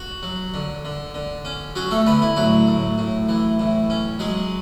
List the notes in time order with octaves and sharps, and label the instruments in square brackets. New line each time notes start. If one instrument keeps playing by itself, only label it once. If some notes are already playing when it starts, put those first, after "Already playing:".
Already playing: [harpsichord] F#4
F#3
D3
D3
D3
C#4
F#3 C#4 F#4
A3 A4
D3 B3 B4
E4
A2 F#3 F#4
A2
A2
E3
A2
C#4
F#3 G#3 G#4